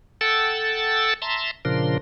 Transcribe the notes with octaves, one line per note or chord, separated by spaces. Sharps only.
A4 F#5 G5 A5 E6 A6
E5 A5 A#5 C6
A#2 C#3 F3 D4 A#4 C6